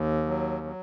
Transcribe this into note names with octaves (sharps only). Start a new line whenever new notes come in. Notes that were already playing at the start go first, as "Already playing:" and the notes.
Already playing: D#2
F#3
F#3